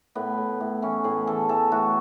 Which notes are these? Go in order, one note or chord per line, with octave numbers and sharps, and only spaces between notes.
A2 B3
A2
A2
E3 C#4
A2 G#4
E3 A4
E3 A4
A2 F#4